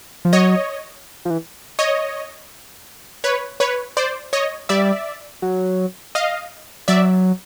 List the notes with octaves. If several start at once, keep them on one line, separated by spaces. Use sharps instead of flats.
F3
F#3 C#5 D#5
F3
E3
C#5 D#5
B4 C#5
B4 C#5
C5 D5
C#5 D#5
G3 D5 E5
F#3
D#5 F5
F#3 D5 E5